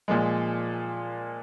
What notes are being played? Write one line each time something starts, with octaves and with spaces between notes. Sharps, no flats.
A#2 F3 G#3